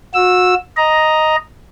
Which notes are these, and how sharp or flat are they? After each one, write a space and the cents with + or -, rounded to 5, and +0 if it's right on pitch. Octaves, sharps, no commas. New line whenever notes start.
F#4 -35 E6 +0
D#5 +0 A#5 +5